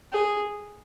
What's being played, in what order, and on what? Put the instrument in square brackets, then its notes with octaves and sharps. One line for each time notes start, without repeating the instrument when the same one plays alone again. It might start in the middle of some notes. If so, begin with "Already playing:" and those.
[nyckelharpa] G#4